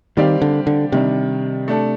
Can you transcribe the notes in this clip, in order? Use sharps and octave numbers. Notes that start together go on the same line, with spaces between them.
D#3 G3 C4 G4 D5 F5
D3
D3
C3 D#3 G3 D4
A3 D4 A4